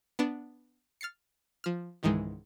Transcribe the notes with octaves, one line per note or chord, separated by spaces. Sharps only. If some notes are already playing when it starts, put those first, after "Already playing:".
B3 D4 E7
F6 A6 C7 C#7
F3 F6
C#2 G#2 D#3 E3 G#3